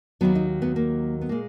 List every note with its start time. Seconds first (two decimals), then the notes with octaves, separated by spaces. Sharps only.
0.21 D#2 D#3 F#3 B3
0.35 D#4
0.62 B3
0.76 A#3
1.21 B3
1.29 A#2 G#3 A#3